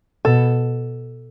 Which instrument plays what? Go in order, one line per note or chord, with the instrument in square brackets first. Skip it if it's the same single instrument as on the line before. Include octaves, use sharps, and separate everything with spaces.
[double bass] B2 [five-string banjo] A4